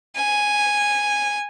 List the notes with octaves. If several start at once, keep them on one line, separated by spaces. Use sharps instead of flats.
G#5